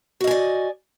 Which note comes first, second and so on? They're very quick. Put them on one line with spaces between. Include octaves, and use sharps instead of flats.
F#4 D#5 G#5 D5